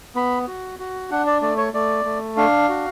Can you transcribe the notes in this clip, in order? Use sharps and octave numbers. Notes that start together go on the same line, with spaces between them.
B3 B5
F#4
F#4
D4 F#5
D5
A3 D5
C#5
A3 D5
A3
D4 F5
F#4